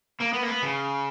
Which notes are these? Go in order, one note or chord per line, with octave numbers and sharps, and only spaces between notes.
A#3
B3
A#3
B3
C#3